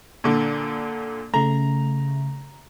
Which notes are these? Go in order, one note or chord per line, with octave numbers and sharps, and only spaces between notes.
A#2 D3
C#3 A3 A#5